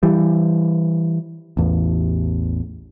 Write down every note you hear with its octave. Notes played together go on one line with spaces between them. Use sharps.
E3 G3
A1 E2